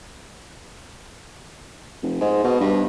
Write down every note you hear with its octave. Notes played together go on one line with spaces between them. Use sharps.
F1
G#2
B2
G2